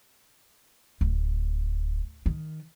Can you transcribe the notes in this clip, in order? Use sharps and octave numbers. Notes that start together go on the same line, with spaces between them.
D1
D#3